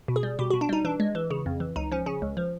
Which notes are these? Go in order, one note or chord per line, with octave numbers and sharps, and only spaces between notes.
B2
G#4
G3
B2 G4
B2 F#4
D4
G3 D#4
E3 D4
G#3
E3
C#3
F2
E3
C#2 D#4
F3 C#4
C#3 C#4
C#2
F3